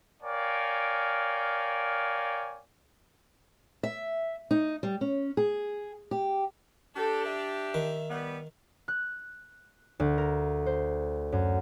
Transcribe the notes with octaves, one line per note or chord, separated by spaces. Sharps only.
A#4 C#5 D5 F5 G5 G#5
E5
D#4
G3
C#4
G#4
G4
D4 G4 A4
E5
D#3
G3 B3
F#6
D2
A#4
C5
F#2